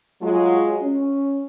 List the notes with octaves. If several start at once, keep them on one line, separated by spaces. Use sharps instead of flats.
F#3 G#3 F4
C#4